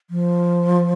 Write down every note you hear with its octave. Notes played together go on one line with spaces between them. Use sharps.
F3